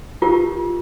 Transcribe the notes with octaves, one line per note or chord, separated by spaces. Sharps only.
F4 G4 A#4